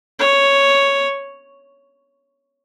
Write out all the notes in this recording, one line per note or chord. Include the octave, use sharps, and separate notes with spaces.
C#5